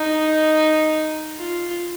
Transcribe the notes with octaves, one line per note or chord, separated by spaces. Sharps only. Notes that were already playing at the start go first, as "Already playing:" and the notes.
Already playing: D#4
F4